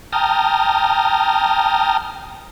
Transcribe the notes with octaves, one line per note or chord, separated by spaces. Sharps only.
G5 A5 A#5 D#6 F6